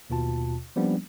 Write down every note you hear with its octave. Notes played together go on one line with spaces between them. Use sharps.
D#2 B2 F4 A5
F3 G3 A#3 B3 C#4 D4